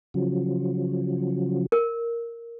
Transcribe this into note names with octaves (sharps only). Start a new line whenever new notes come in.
C#3 F3 F#3
A#4